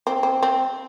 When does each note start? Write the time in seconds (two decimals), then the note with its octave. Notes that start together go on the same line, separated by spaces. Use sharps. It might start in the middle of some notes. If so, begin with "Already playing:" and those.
0.07 C4
0.23 C4
0.43 C4